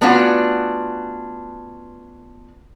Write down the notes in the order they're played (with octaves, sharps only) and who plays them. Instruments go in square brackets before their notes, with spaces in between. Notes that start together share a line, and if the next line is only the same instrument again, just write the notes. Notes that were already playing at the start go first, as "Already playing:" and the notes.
[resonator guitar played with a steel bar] A3 B3 C#4 D4 F4 F#4